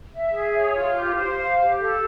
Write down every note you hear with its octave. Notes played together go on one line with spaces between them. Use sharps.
E5
G#4
C#5
F4
G4
C5
F5
G4
A4